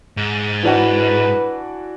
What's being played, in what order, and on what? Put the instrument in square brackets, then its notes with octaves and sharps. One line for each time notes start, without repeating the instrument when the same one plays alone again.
[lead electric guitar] G#2
[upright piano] E3 D4 F#4 [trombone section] B4